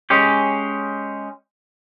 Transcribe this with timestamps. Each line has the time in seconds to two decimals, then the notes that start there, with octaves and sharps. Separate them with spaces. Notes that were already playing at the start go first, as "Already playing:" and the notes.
0.10 G#3 C#4 G4